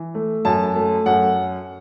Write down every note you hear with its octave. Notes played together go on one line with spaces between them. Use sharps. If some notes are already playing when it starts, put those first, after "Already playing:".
Already playing: E3
A3
F#2 A5
A3
F#2 F#5